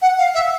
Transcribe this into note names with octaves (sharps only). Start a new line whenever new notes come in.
F#5
F5
E5